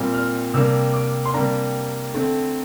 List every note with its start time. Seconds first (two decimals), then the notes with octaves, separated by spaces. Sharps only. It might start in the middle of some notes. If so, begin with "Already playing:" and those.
Already playing: A#2 G3 C4
0.14 F6
0.54 C3 G3 A#3 D4 E6
0.94 D6
1.25 C6
1.34 C3 G3 A#3 D4 A#5
2.14 D3 A3 C4